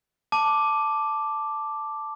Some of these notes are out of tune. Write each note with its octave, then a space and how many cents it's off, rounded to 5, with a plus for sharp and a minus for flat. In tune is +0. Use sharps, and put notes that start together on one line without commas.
A5 +0 D6 +0